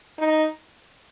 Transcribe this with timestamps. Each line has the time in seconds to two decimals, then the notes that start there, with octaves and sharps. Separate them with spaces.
0.19 D#4